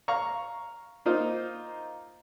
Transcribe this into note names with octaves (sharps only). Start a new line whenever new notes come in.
F5 A#5 C#6
A#3 D#4 F4 C5